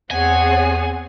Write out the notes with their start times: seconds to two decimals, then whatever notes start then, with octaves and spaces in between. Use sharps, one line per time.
0.11 E2 C4 G#4 C#5 F#5 G#5